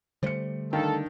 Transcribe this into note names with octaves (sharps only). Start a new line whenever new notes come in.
D3 G3 A3 C5 C#7
D#3 D4 A4 F5